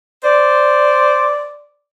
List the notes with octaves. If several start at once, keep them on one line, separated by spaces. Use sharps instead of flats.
C5 D5